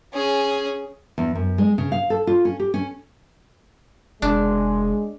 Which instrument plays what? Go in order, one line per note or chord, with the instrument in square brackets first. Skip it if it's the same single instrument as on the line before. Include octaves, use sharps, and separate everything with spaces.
[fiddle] C#4 G#4
[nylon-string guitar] E2
F#2
G#3
C#3
F5
A4
F4
C#4
G4
C#4
[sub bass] F1 [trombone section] G#3 [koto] D4